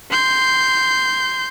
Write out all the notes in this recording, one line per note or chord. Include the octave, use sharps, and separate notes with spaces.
C6 G6